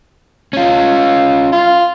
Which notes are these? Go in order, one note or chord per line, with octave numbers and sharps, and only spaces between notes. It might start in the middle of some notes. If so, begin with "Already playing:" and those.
C#4 F4
F4